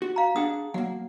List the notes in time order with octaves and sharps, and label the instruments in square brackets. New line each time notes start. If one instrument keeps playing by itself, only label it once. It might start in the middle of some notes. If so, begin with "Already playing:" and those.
[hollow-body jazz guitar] F#4
[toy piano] F5 A#5
[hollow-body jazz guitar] D4 G#4 F#5 [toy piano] D#6
[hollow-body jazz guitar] F#3 A#3 [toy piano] F#5